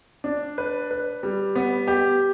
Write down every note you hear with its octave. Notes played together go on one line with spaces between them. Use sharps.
D4
B4
B4
G3
B3
G4